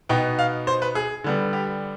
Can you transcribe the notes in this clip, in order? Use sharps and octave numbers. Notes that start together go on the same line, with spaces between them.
B2 B3 D#4 G5
F5
C5
B4
G#4
D3 G3 B3
G4